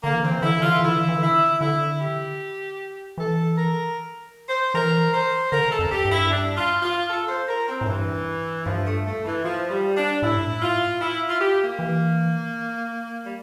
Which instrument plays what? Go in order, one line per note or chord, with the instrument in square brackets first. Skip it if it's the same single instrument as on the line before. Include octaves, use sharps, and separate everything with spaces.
[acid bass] D3 [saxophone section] A#3
[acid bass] E3
[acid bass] D3 [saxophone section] C4
[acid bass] E3
[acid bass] D3 [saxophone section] E4
[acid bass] E3
[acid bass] D3 [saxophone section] F4
[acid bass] E3
[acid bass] D3 [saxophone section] E4
[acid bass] E3
D3
E3
[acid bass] D3 [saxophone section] E4
[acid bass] D3 [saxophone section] E4
[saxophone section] G4
[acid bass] E3 [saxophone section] A4
[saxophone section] A#4
C5
[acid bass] E3 [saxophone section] A#4
[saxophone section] C5
[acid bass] D3 [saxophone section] A#4
[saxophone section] A4
[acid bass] F2
[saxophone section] G4
[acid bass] G2
[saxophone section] E4
D4
F4
F4
A4
C5
A#4
C4
[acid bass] A2
[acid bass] G2 [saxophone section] E3
[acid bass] G2 [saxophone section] F3
[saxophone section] A3
A3
E3
F3
G3
D4
[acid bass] A2 [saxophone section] E4
[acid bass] G2
A2
[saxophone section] F4
E4
F4
G4
A#3
[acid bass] E3
[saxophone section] G3